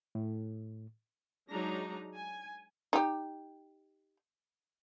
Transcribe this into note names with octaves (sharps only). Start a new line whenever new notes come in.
A2
F#3 G#3 D4 D#4 A#5
G#5
D#4 G4